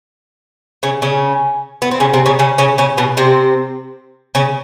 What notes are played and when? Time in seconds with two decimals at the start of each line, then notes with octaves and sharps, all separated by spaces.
0.83 C#3 C#4
1.02 C#3 C#4
1.82 B3
1.91 C4
2.00 C#3 C#4
2.14 C3 C4
2.26 C#3 C#4
2.39 C#3 C#4
2.58 C#3 C#4
2.78 C#3 C#4
2.97 B2 B3
3.17 C3 C4
4.35 C#3 C#4